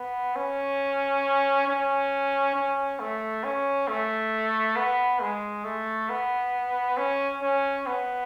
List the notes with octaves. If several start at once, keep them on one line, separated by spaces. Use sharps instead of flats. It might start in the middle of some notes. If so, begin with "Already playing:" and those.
Already playing: B3
C#4
C#4
C#4
A3
C#4
A3
B3
G#3
A3
B3
C#4
C#4
B3